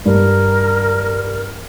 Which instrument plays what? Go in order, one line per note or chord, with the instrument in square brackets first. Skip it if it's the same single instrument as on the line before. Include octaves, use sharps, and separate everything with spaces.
[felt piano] G2 [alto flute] A#4